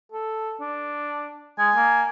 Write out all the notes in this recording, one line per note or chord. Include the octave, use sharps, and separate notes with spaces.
A4
D4
G#3 G#5
A#3